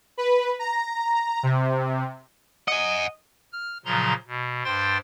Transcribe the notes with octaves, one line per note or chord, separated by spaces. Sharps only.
B4
A#5
C3
D#5 F#5 G#5
F6
A#2 C#3 F3 F#3 A#5 C6
B2
G2 C5 G5 C6 A6